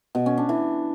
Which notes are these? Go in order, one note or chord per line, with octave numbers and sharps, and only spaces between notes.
B2
C#4
D4
E3